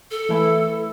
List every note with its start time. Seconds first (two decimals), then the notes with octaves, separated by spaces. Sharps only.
0.11 A4
0.29 E3 A3 E4